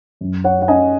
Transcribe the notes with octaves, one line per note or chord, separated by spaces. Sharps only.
F#2
C#5 F#5
F#5
C#4 D#5 G#5